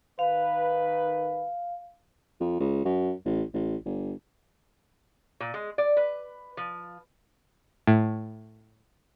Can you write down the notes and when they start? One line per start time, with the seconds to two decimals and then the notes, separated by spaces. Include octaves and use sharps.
0.19 D#3 B4 F5
2.40 F2
2.60 C#2
2.85 F#2
3.25 A1
3.54 A1
3.85 G1
5.40 A#2
5.54 G#3
5.78 D5
5.97 B4
6.57 F3
7.87 A2